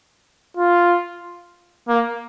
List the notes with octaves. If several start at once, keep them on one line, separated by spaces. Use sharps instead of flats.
F4
A#3